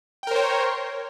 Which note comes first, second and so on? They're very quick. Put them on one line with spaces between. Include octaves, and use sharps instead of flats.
G5 A#4 C5 C#5